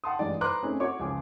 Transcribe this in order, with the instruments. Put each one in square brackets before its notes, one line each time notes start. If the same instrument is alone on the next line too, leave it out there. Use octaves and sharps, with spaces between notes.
[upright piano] F#5 G5 A5 C6 D#6
A1 G2 G#3 D5
B4 C5 A#5 C6 D6 F#6
A3 C4 C#4 D#4 G#4
F#4 C#5 D6
C#2 F3 G#4 D6